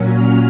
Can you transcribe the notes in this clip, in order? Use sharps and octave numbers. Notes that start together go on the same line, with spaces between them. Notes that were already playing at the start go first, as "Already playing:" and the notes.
Already playing: A#2 F#3 C#4
F6